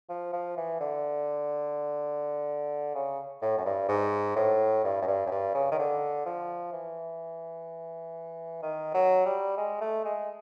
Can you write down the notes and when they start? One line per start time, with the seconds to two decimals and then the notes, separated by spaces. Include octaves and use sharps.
0.09 F3
0.33 F3
0.57 E3
0.80 D3
2.95 C#3
3.42 A2
3.57 F#2
3.65 G2
3.89 G#2
4.36 A2
4.84 G2
5.02 F#2
5.07 G2
5.26 F#2
5.31 G2
5.55 C#3
5.72 D#3
5.79 D3
6.26 F3
6.73 E3
8.62 D#3
8.94 F#3
9.26 G3
9.57 G#3
9.81 A3
10.05 G#3